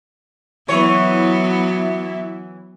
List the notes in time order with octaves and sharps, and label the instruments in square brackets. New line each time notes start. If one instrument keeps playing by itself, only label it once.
[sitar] E3 C#5 [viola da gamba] F#3 B3 [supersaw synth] E4